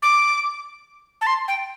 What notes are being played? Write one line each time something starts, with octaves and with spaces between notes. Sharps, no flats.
D6
A5
C6
G5